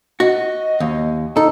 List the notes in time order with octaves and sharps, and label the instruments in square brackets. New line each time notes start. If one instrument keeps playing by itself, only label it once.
[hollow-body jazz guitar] F#4 [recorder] D#5
[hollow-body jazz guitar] D#2
[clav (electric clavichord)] D#4 [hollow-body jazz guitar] A4